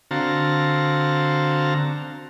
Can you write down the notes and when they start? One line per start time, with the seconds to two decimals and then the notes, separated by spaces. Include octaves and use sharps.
0.11 D3 C4 F#4 F5 A5 A#5